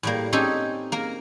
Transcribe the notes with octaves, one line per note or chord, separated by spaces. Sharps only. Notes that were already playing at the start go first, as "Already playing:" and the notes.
A2 G3 A#3
C4 C#4 D#4 G4 A4 G#5
A#3 A#4